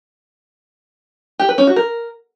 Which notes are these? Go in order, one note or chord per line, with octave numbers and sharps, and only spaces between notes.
G4
B4
C#4
F#4
A#4